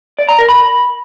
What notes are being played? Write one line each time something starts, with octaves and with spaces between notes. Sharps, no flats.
D5
A#5
A#4
B5